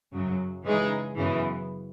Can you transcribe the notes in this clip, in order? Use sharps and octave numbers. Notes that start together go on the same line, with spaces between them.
F#2 C#3 F#3
C#3 E3 G#3 D#4 G#4
F#2 C#3 E3 B3